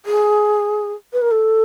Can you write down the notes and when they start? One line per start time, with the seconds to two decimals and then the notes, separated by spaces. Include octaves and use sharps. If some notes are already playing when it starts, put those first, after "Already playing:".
0.06 G#4
1.13 B4
1.22 A#4
1.31 A4